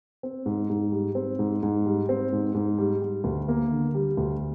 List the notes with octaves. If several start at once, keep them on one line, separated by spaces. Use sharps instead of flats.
C4
G#2
G#2
G3
C4
G#2
G#2
G3
C4
G#2
G#2
G3
G3
D2
A#3
D3
G3
D2